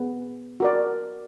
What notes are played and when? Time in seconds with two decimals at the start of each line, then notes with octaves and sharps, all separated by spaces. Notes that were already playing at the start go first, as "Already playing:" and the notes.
Already playing: B3 G#4
0.60 F#4 A#4 D5